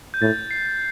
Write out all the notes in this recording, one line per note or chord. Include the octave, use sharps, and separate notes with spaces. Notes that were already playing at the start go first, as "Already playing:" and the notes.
G6
A2 A6
C7